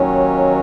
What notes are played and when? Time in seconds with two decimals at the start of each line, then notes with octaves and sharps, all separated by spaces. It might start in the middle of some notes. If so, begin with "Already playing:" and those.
Already playing: D#2 D#3 F#3 C#4